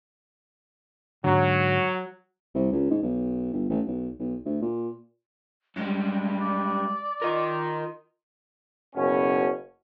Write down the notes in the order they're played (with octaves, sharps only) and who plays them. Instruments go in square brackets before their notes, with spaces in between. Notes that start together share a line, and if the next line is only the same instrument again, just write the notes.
[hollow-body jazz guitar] G#2 D3 [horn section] F#3
[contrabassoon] C2
C#2
G#2
B1
G1
A1
B1
B1
D2
A#2
[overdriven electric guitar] F#2 G3 [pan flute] G#3
[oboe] D5
[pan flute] F4 [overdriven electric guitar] A#4 D#5
[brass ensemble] F#1 B2 C#4